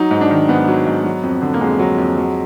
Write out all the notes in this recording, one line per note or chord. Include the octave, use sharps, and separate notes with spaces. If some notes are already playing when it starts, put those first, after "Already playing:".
Already playing: F#3 D#4
G#2
D4
D#3
G#2 B3
F#3
G#2
F#3
F2
D3
A#3
F2 G#3
F#3
F2
F#3